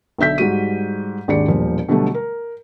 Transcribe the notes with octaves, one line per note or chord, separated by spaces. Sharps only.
B1 D3 E5 G6 B6
G#2 G3 F#4 D#7
G#1 D#2 D4 G#4 D5 C#7
E1 A#2 F3 G3
B2 D3 F#3 G3 A3
A#4